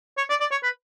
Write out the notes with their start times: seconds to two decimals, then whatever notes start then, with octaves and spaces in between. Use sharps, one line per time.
0.18 C#5
0.30 D5
0.40 D5
0.51 C#5
0.63 B4